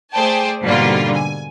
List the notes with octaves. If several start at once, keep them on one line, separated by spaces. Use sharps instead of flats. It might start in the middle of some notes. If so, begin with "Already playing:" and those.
A3 G#4 C5 D5 G5 A5
G#2 B2 D3 G3 A#3 F4
G#5